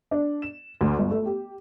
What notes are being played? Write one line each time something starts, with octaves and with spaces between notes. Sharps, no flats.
D4
E7
D2
G1
A3
G4